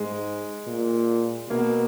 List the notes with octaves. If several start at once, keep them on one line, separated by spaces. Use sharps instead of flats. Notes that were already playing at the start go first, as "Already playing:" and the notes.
Already playing: G#2 G#3
A#2
B2 A#3